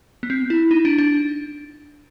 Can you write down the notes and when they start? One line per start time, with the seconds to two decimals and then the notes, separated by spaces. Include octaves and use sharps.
0.23 B3
0.30 C4
0.50 E4
0.71 D#4
0.85 D4
0.98 D4